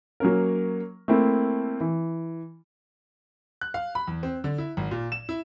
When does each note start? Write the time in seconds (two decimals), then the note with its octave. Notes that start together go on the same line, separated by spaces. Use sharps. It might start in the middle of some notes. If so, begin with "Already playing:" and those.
0.20 F#3 A#3 C#4 A#4
1.08 A3 A#3 C4 E4
1.81 E3
3.61 F#6
3.74 F5
3.95 B5
4.07 E2
4.23 C4
4.44 D3
4.58 E4
4.77 G#1
4.91 A#2
5.12 E7
5.29 E4